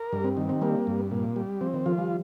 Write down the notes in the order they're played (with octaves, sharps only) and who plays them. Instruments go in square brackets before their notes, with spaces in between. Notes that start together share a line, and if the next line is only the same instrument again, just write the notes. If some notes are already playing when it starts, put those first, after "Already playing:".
Already playing: [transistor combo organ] A#4
[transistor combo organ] G2 [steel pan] G3
[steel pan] C4
[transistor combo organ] D#3 [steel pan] C4
[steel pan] C4
[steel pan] G3 [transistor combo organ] A#3
[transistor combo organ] G2
A#2
G3
[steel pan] F3 [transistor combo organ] C4
[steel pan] D#3
[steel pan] F3 [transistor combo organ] F4
[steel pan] G3